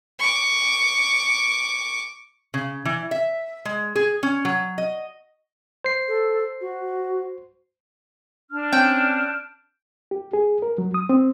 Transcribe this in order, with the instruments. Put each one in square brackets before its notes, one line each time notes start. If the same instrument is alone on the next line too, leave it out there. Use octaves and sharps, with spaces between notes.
[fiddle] C#6 D6
[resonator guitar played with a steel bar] C#3
E3
E5
G#3
G#4
C#4
F#3
D#5
[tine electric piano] C5 C7
[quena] A4
F#4
[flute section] D4 F6
[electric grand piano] C4 C#4 [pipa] G5 [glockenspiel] G6 D7
[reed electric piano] G4
G#4
A#4
F#3
D#6
C4